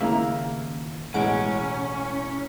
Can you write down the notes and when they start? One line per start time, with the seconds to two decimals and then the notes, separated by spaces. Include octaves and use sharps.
0.01 D#2 A#2 C#3 A#3 E4 E5 F5 A#5
1.14 A1 B2 E3 G#3 C#4 F#5 D7